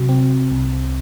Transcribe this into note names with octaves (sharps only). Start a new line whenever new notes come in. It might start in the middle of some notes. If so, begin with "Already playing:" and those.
Already playing: C3 F#3 F#4
C4
C2